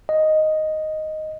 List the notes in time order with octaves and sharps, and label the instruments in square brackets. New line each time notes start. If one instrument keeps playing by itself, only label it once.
[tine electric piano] D#5